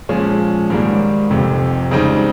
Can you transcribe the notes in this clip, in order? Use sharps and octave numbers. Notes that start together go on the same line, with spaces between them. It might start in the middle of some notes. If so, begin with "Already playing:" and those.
A#2 F3 G#3 C#4
G#2 D#3 G3 A#3
F1 F2 C3
C#2 C#3 G3 C4 D#4